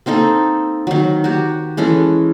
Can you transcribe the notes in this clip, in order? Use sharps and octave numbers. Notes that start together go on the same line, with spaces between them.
A#3 C4 D#4 A4
D#3 F#3
F#4 G4
E3 G#3 C#4 A4